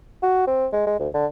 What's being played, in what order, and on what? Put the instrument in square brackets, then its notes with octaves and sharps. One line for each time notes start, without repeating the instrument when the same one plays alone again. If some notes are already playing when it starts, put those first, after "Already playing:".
[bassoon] F#4
C4
G#3
G#3
D2
D3